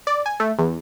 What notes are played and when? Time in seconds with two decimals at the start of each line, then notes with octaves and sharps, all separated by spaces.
0.07 D5
0.26 G#5
0.40 A3
0.58 E2